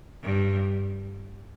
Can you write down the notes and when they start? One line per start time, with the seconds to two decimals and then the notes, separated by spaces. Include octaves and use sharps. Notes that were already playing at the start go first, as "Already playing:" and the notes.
0.23 G2